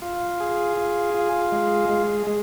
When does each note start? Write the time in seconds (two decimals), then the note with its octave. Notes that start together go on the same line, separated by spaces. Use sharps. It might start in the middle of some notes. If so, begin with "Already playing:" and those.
0.02 F4
0.40 G#4
0.77 F4
1.14 F4
1.52 G#3
1.89 G#3
2.27 G#3